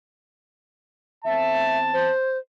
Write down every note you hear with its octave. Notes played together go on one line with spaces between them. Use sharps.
E2 C4 E5 A5
C5